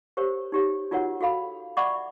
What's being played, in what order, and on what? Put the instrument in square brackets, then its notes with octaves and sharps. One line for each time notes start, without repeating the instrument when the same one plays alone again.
[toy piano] G4 A#4 C5 C#5
D#4 G4 C#5
D#4 F4 F#4 A#4 C#5 F#5
F#4 A4 F5 B5
D5 E5 F#5 B5 C#6 D6